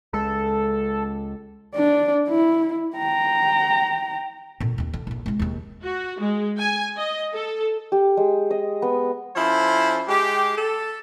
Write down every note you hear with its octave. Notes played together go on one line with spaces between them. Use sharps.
C#2 G#3 A4
D4 D5
E4
G5 A#5
A#2 D3
D#2 D#4
D3
A#1 D3
C#3 G#3
D#2 C#3
F#4
G#3
G#5
D#5
A4
G4
G#3
D#5
B3
F3 C#4 E4 A4 C5
G#3 G4
A4